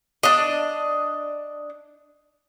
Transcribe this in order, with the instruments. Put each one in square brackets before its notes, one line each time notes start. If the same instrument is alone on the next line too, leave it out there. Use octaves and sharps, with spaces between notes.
[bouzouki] D4 D#5